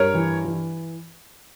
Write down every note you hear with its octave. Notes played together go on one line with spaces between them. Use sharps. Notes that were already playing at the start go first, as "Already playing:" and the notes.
Already playing: G2 A#4 C#5
E3
E3